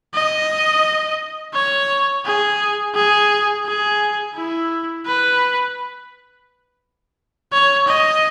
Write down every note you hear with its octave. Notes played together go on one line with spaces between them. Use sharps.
D#5
C#5
G#4
G#4
G#4
E4
B4
C#5
D#5